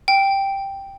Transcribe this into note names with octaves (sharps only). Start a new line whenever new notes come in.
G5